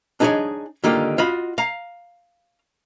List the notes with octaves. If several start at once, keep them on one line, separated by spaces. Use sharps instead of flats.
D4 D#4 G#4 B4 C#5 D#5
D3 D#3 A#3 D#4 F4 G4
F4 F#4 D#5 B5
F5 A#5